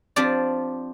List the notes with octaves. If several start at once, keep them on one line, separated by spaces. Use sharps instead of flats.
F3 C4 D4 G4 D5